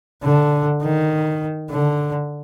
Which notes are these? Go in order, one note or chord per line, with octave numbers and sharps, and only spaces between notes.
D3
D#3
D3